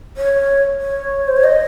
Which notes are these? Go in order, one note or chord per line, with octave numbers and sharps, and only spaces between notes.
C#5
C#5
C5
C#5
D#5